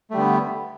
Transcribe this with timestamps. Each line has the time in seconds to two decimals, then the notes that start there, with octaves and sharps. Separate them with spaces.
0.10 A3
0.14 G3
0.17 D3
0.20 B3